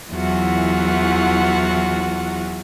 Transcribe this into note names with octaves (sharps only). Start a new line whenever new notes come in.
E2 E3 F#3 F4 F#4 F#5